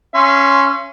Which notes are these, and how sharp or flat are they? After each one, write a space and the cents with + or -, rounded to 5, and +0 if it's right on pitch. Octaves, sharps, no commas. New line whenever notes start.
C#4 +0 F5 -45 C6 +0